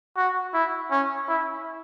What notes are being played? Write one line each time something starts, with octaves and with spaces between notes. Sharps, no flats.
F#4
E4
C#4
E4